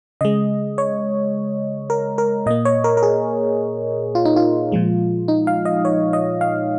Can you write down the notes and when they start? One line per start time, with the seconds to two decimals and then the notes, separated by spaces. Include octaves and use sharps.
0.21 C#3 G#3 D#5
0.78 C#5
1.90 A#4
2.18 A#4
2.46 A#2 A#3 D#5
2.65 C#5
2.84 A#4
2.97 A#4
3.03 G#4
4.15 F4
4.25 D#4
4.36 F4
4.72 A#2 F3 G#3
5.28 D#4
5.47 F5
5.65 D#5
5.85 C#5
6.13 D#5
6.41 F5